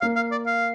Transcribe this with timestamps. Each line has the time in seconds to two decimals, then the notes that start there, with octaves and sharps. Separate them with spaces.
0.01 A#3 F5
0.16 F5
0.32 D5
0.46 F5